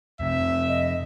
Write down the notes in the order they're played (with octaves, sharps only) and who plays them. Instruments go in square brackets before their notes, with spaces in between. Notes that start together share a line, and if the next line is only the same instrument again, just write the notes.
[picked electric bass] F2 C3 [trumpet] E5
[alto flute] D#5